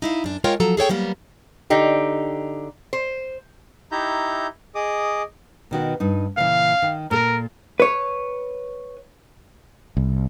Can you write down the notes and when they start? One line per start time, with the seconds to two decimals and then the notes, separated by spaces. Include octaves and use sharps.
0.02 D#4 E4 F5
0.24 F#2 D4
0.44 G#3 F4 A#4 C#5 F5 G5
0.60 F3 F#3 A4 A#5
0.77 G#4 A4 C#5 G5
0.89 F#3 G3 A#3 B3
1.70 D3 D#4 G4
2.93 C5
3.92 D#4 E4 G4 E5 A#5 G6
4.75 G#4 D#5 D6 D#6
5.71 B2 D#3 F#4
6.00 G2 D#4
6.37 A#2 C#3 E3 F5
6.82 D#3
7.11 A#2 A4 A#4
7.80 B4 C#5
9.97 C2